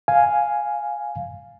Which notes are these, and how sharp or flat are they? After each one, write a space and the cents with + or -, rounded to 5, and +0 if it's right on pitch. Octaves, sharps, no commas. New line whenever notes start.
F5 +0 G#5 +0